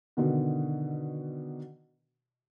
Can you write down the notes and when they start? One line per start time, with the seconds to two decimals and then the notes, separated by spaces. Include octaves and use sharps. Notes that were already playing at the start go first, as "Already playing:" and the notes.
0.17 B2 D3 D#3